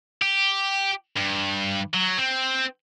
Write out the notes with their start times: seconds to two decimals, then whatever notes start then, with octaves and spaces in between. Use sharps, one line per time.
0.22 G4
1.16 G2
1.94 F#3
2.18 C4